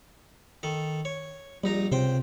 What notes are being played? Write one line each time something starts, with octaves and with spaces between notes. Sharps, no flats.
D#3 A4
C#5
A#1 G3 D#4 A#5
C#2 C3 C5 G5